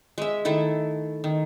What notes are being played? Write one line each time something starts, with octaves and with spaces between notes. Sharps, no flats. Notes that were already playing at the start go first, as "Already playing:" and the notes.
G#3 E5
D#3 A3 E4 A4
D#3